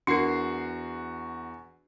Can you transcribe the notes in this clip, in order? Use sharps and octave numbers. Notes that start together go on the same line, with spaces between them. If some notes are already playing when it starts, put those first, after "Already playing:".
E2 D4 F#4 A#4 C7